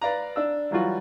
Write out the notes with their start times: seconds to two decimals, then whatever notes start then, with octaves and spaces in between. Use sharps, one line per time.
0.01 B4 D5 F5 A#5
0.36 D4 E6
0.71 E3 F#3 G3 F4 F#4